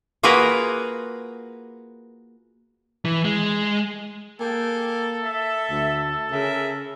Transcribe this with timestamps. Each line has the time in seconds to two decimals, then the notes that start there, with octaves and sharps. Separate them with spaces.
0.23 A#3 F4 F#4 G#4 A#4 B4
3.05 E3
3.25 G#3
4.40 A#3 G#4 A4 G5
5.24 E5
5.70 D2
6.32 C#3 G#4 A#4 E5